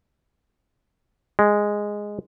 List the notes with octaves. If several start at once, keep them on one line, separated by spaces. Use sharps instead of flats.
G#3